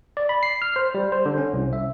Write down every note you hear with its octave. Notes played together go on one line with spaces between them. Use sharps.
D5
B5
C7
F6
C5
G3
C5
D3
C#4
C2
E5